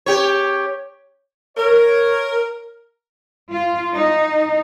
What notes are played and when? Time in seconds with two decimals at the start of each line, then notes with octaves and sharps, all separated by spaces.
0.06 G4 C#5
1.57 A#4 C#5
3.49 F4
3.93 D#4